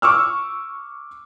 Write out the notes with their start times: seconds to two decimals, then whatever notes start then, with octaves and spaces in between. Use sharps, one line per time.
0.02 C#6 D6 E6 F6